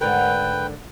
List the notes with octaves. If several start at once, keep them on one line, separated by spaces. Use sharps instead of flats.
G#2 D3 A#4 B4 G5